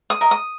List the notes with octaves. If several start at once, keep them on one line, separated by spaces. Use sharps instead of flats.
D#6
A#4 D#5
D#6